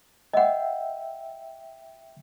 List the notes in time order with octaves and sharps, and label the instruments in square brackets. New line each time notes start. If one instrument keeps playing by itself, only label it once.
[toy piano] D#5 F#5 [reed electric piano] E5 G5